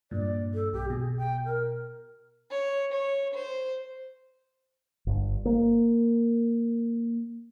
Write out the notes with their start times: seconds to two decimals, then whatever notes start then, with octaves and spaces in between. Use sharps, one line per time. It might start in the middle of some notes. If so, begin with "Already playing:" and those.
0.11 G2 A#2 D5
0.54 A4
0.73 B1 G4
0.90 B2 G#4
1.17 G5
1.45 A#4
2.50 C#5
2.92 C#5
3.35 C5
5.07 G1
5.45 A#3